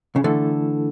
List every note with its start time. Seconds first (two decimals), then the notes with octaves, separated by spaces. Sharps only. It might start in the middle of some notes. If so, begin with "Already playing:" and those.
0.16 C#3
0.24 D3 E3 A3 E4 A4